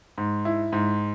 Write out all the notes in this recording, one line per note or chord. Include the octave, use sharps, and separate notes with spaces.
G#2
E4
G#2